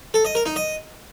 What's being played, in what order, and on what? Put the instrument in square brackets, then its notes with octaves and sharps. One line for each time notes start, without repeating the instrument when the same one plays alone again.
[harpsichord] A4
D#5
A#4
D#4
D#5